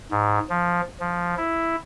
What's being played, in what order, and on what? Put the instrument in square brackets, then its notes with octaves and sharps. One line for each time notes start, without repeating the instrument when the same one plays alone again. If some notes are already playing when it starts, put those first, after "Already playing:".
[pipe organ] G#2
F3
F3
E4